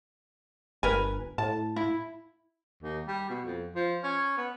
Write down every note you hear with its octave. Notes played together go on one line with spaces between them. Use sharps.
G1 A#4 B4 G#5
A2 A5
E4
D#2
G3
B2
F2
F3
C#4
B3